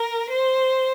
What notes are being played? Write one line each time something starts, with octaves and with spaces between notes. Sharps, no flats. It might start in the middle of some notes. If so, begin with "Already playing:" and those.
Already playing: A#4
C5